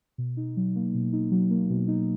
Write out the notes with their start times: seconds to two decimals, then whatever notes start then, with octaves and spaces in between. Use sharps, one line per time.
0.18 B2
0.37 D#4
0.57 F#3
0.76 A#3
0.95 B2
1.13 D#4
1.31 F#3
1.51 A#3
1.70 B2
1.88 D#4